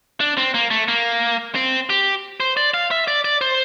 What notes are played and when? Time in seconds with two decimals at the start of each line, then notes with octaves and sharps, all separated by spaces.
0.20 D4
0.38 C4
0.54 A#3
0.70 A3
0.88 A#3
1.55 C4
1.90 G4
2.40 C5
2.57 D5
2.74 F5
2.91 E5
3.08 D5
3.25 D5
3.41 C5